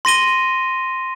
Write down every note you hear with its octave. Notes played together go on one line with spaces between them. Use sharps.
C6 A#6 D#7 G7